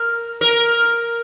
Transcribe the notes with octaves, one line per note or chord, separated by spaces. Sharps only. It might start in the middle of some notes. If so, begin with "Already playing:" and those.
Already playing: A#4
A#4